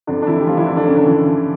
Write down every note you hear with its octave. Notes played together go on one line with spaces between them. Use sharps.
F2 D3 D4
D4
E3 E4
G4
F3 F4
E3 E4
D3 D4
D3 D4
C#3 C#4
D4
E3 E4